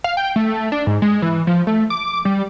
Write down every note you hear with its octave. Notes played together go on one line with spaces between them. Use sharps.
F5
G5
A3
D4
G#2
G#3
E3
F3
A3
D6
G3